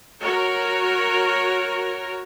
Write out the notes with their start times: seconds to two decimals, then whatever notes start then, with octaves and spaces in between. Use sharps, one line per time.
0.23 F#4 A#4 C#5